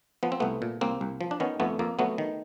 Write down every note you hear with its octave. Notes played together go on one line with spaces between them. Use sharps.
F3 B3
C4
C2 A3 B3
A#2
C2 A#3 C4
C2
F3
D4
D#3 B3 C#4
F2 A3 B3
F2 A#3
F#3 A3 B3
D#3